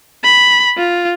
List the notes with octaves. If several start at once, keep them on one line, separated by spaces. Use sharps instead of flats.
B5
F4